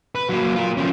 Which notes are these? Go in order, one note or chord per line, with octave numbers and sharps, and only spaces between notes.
B4
F#3 A#3
F4 A#4
F3 C#4